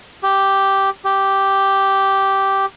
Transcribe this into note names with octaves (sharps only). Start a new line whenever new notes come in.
G4
G4